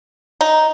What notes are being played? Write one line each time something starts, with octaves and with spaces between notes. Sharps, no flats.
D#4